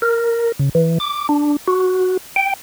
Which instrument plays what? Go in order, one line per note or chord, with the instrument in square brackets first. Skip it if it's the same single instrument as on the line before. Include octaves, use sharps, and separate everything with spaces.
[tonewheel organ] A#4
C#3
E3
D6
D4
F#4
G5